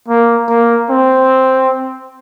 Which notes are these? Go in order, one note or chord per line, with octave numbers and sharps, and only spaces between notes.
A#3
A#3
C4